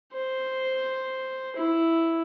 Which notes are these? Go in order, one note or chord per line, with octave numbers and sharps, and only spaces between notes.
C5
E4